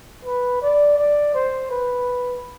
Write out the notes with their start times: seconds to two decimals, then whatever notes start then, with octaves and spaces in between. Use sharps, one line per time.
0.25 B4
0.62 D5
0.98 D5
1.34 C5
1.71 B4